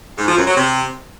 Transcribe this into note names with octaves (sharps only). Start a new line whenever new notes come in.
G#2
F3
F#2
F#3
C3